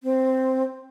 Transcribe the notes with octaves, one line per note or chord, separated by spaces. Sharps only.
C4